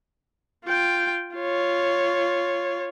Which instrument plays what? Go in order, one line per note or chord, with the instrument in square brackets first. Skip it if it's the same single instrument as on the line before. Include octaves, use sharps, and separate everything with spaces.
[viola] F4 G5
F4 C#5